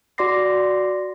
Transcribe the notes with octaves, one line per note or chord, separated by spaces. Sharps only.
F#4 D5 C6 D6 A#6 C7